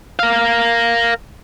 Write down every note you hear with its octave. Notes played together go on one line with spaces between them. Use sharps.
A#4 F5